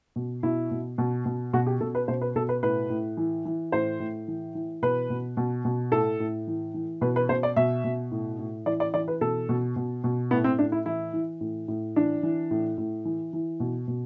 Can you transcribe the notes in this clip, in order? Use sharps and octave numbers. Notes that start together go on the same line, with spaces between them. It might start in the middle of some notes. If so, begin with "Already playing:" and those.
B2
B2 E4
B2
B2
B2
B2 F#4
G4
B2 A4
B4
B2 C5
B4
B2 A4
B4
A2 B4
A2
E3
E3
A2 C5
A2
E3
E3
B2 B4
B2
B2
B2
A2 A4
A2
E3
E3
B2 B4
B4
B2 C5
D5
B2 E5
B2
A2
A2
E3 D5
D5
E3 D5
B4
B2 A4
B2
B2
B2
A2 B3
C4
A2 D4
E4
E3 E4
E3
A2
A2
E3 D4
E3
A2
A2
E3
E3
B2
B2